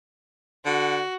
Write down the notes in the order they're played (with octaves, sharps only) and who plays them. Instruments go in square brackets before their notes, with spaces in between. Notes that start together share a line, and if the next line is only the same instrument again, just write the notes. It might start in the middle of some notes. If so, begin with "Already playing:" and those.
[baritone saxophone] D3 [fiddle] F#4